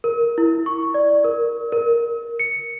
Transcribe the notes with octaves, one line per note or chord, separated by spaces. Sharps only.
A#4
E4
C#6
D5
A#4
A#4
C#7